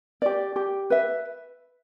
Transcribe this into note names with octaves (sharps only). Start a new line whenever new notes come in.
G4 D5
G4
B4 E5